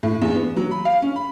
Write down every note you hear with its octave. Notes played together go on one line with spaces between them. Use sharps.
A2
E2
B3
F#3
B5
F5
C#4
B5